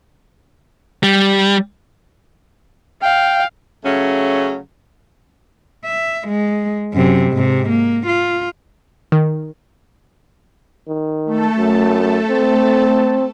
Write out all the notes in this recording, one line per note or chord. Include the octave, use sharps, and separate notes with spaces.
G3
F5 G5
C#3 F#3 A3 C#4
E5
G#3
F#2 C3
G#2 C3
A#3
F4
D#3
D#3
A3 A4
F#2
C4